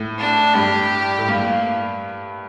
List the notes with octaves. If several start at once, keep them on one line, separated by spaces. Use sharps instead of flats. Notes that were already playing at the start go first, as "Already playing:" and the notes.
Already playing: A2
D4
G2 G4
A2
G2 A#3